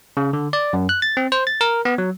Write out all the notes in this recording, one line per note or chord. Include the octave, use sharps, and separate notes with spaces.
C#3
D3
D5
F#2
F#6
A6
C4
C5
A6
A#4
B3
F#3